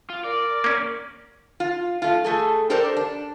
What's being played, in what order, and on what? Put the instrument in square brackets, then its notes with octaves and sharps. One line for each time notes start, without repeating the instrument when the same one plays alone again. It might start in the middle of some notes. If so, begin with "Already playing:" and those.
[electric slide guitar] F4
[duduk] A#4 [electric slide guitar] D5
[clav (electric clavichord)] A#3 C#4
[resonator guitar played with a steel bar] F4
A3 F4
A3 G#4 A4
D4 G4 A4 A#4 C5 D5
D4